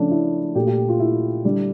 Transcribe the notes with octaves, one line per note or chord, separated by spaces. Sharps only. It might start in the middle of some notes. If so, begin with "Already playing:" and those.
Already playing: C#3 F3 A3 C#4 D4
E4
A#2 A3 G4
G4
F4
E4
D3 G3